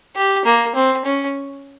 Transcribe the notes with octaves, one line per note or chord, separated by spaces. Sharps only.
G4
A#3
C4
C#4